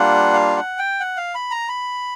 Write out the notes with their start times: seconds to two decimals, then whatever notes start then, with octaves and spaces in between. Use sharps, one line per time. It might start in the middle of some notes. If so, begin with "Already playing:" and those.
Already playing: G3 A#3 D4 F4 F#5
0.34 F5
0.56 F#5
0.79 G5
1.00 F#5
1.17 F5
1.35 B5
1.51 A#5
1.69 B5